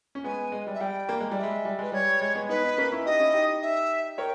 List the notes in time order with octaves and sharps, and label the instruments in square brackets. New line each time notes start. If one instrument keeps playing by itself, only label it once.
[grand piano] C#4
[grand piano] G#3 B3 [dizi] G#5
[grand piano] G#3
G3
[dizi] E5
[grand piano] G3 [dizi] G5
[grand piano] A#3
G#3
G3
[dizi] E5
[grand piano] G#3
G3
[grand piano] G#3 [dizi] B4
[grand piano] G3 [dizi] C#5
[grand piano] G#3
G#3 B3
[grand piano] B3 D#4 [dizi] B4
[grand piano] B3 D#4
A#3 C#4
C#4 E4
[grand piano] D#4 G4 [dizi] D#5
[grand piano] C#4 E4
D#4 G4
[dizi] E5
[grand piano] A#4 C#5 [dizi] G5